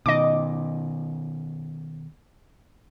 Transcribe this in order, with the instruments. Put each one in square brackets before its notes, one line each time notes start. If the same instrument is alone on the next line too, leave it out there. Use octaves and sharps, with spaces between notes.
[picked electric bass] B2 D#3 [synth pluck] D#5 D6